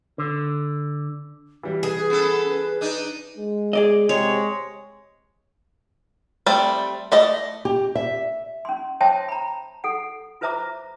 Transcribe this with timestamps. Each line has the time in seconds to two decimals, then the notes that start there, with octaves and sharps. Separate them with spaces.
0.18 D3
1.63 E3 G3 E4
1.83 G#4 B4
2.10 B3 C#4 A4
2.48 B4
2.81 D4 D#4 B4
3.37 G#3
3.73 G#4 D5 D#5
4.09 C3 G#3 C#5
6.46 G3 A3 C4 D5
7.12 A3 D5 D#5
7.65 G4
7.95 E5
8.65 C#4 C6
9.01 C5 C#5 E5 G5 A5 C6
9.29 A#5 B5
9.84 A4 F#5
10.41 F4 B4 C5 E5 A#5 D6